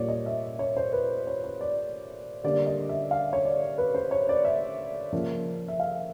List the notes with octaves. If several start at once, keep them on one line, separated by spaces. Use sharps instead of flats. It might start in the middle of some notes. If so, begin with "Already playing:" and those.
Already playing: A#2 G3 A#3 C#5 D5
D#5
E5
C#5
C5
B4
C#5
C#5
D5
D3 G3 A#3 D5
D#5
E5
F5
C#5
D5
B4
C5
C#5
D5
E5
C#3 F3 A#3
E5
F5